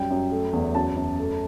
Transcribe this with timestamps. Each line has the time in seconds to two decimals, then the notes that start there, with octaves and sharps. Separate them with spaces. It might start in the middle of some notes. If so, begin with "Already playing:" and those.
Already playing: F#2 G3 G5
0.10 F#2
0.31 A3
0.53 E2
0.75 F#2 A5
0.96 F#2
1.19 A3